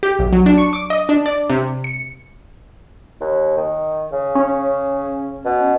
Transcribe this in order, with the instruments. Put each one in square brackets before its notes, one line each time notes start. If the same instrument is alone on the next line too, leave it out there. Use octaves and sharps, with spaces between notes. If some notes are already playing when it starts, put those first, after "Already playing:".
[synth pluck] G4
B1
F#3
D4
C#6
D6
D#5
D4
D5
C3
C#7
[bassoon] D#2
D#3
C#3
[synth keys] C#4
[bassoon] B2